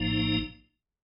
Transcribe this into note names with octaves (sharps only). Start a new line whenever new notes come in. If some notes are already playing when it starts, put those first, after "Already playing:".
Already playing: A#1 A2 F3 A#3 D#4